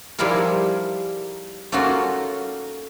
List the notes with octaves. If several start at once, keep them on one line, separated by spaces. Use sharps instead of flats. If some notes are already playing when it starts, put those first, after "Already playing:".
F3 G3 D#4 E4 G#4 A#4
A3 A#3 C#4 D#4 F4 F#4